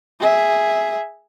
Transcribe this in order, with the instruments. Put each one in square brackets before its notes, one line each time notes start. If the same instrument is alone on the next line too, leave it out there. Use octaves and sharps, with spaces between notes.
[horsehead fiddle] G#4 E5